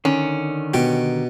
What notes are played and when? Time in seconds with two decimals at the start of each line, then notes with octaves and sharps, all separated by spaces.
0.05 D3 D#3 C#4
0.74 B2 G4